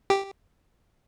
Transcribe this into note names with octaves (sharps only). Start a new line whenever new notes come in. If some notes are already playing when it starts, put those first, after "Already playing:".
G4